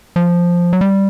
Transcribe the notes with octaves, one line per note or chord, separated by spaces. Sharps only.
F3
F#3
G3